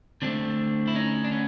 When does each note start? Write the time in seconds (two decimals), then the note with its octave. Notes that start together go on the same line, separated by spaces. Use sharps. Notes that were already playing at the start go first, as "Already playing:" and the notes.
0.22 D3 F#3 A3 C4 D4
0.88 E4
0.95 C#4 D#4
1.24 D4
1.32 B3 C#4